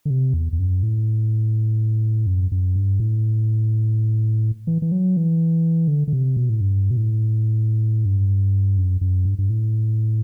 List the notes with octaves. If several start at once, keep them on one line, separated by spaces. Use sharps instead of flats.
D3
C3
E2
E2
F#2
A2
F#2
F#2
G2
A2
E3
E3
F#3
E3
D3
D3
C3
B2
A2
G2
B2
A2
G2
F#2
F#2
G2
G2
A2